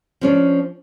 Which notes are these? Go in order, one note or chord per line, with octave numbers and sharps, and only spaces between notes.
F3 C#4 D4